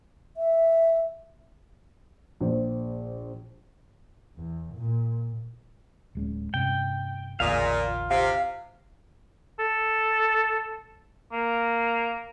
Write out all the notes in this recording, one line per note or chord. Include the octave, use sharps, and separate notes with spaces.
E5
A#1 C5
E2
A#2
D1 G#3 C#4
G2 C3 C#4 G5
A1 E2 A#2 D3 G#4 D#5 F5
F4
C3 F5
A4
A#3